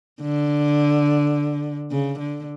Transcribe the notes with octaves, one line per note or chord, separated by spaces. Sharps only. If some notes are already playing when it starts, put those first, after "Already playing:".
D3
C#3
D3